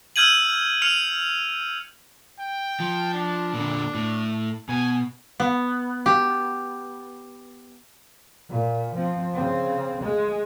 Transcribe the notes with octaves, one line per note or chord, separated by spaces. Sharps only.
E6 F6 G6 G#6 D#7 F#7
F6 C#7 D#7 F7
G5
F3
D4
A#2 D3
A2
B2 G#5
B3
G4
A#2
F3 C4
C#3 C4
G#3